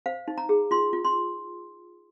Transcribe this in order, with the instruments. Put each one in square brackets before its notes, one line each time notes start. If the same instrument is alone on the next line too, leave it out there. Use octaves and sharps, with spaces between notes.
[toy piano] C5 F5
D#4
A#5
G#4
F4 C6
F4
C6